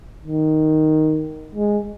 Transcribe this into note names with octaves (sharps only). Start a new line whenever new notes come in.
D#3
G#3